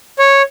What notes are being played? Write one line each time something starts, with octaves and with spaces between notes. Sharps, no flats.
C#5